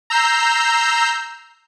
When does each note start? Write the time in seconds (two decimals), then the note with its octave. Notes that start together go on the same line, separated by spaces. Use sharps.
0.10 A#5 E6 G6 C7